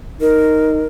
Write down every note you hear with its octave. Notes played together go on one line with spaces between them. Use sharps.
D#4 A#4